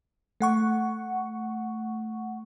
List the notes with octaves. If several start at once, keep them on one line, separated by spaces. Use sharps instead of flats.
A3 F#5 C#6